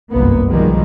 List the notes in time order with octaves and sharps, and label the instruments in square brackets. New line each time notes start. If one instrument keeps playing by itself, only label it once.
[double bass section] G1 C2 F#2 A#3 B3
B1 B2 D#3 F3 G3 G#3